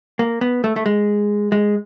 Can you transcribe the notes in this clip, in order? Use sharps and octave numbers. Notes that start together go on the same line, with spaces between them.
A#3
B3
A3
A3
G#3
G#3